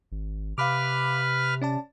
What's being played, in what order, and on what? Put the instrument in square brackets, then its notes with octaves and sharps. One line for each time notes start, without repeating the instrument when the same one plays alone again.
[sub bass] G#1
[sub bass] C3 [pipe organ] B4 F6 [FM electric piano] F5 B5 D6
[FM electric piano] C#4 D5 A5